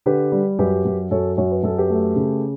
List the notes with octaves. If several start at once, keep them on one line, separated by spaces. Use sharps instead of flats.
D3 G4 B4
G3
F#2 G4 B4
F#2
F#2 A4 C#5
F#2 C#5
B4
F#2 A4
G4 B4
A3
C#3